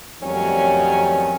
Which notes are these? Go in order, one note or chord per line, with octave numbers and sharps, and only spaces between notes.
F2 A2 D#3 F#3 G3 C#4